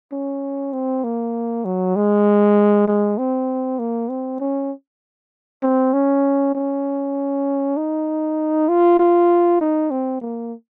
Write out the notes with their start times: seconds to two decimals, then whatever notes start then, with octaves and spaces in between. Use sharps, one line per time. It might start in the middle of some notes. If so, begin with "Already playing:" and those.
0.12 C#4
0.73 C4
1.04 A#3
1.65 F#3
1.96 G#3
2.88 G#3
3.18 C4
3.79 A#3
4.09 C4
4.40 C#4
5.63 C4
5.93 C#4
6.55 C#4
7.77 D#4
8.69 F4
8.99 F4
9.61 D#4
9.91 C4
10.21 A#3